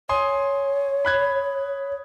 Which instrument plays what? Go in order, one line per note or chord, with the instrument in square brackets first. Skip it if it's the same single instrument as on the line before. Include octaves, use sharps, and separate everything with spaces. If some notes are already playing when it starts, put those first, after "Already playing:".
[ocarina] C#5 [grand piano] G#5 C6 D#6
[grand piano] B5 F#6 G#6